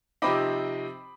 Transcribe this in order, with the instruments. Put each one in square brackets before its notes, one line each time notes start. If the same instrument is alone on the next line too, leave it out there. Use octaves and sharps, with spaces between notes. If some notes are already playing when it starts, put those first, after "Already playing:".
[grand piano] C3 F3 C4 D#4 B5 D6